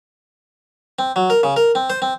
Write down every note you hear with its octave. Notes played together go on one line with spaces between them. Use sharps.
C4
F#3
A#4
C#3
A#4
C4
C5
C4